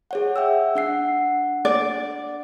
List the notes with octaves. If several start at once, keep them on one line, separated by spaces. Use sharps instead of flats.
G#4 C#5 F#5
E5 G5 E6
D4 F#5 C7
D5